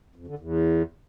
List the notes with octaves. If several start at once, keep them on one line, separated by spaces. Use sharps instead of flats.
F2
D3
E2